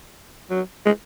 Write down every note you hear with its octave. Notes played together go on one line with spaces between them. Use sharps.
F#3
G#3